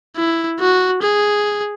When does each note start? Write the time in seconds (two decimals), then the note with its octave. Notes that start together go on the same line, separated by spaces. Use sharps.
0.17 E4
0.60 F#4
1.02 G#4